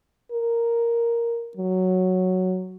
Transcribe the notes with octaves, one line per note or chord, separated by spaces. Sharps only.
A#4
F#3